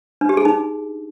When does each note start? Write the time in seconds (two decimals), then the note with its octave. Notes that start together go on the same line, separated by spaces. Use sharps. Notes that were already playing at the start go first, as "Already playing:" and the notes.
0.21 D4
0.29 G4
0.37 G#4
0.45 D#4